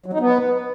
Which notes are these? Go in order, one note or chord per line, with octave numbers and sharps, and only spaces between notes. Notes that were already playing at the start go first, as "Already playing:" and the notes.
F#3
D#4
B3